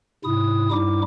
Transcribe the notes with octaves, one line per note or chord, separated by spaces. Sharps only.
G#2 C3 E4 D#6
G2 G3 D#4 E4 D6